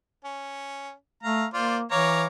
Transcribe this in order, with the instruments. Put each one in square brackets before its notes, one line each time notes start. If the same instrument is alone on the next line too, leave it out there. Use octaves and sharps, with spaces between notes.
[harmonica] C#4
[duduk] A3 [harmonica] F5 A#5
[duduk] A#3 [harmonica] F4 C5 D5
[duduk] E3 [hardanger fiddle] C#5 [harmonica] F5 A#5 D6